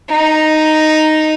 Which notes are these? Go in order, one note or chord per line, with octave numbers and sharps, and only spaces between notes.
D#4